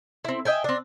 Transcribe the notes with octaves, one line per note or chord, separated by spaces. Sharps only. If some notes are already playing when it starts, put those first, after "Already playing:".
C4 E4
D#5 E5 G5 G#5
C4 D4